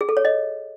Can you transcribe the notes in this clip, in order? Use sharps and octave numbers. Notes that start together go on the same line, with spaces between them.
G#4
A4
C#5
D#5